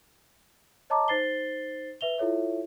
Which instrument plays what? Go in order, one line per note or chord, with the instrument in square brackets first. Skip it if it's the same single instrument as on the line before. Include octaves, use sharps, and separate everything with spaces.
[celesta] C#5 D#5 A5 A#5 D6
D#4 C5 A6 C7 G7
B4 E5 F7 G7
E4 F4 A4 C#5 E5